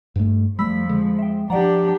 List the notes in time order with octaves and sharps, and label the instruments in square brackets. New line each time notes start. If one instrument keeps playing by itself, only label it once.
[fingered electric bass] G2 A3
[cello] F2 F3 [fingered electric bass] G3 A3 [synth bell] B5 E6 B6
[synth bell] D3 [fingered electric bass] G#3
[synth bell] E5 G5
[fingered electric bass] F3 [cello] D4 G4 [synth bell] D5 F#5 A#5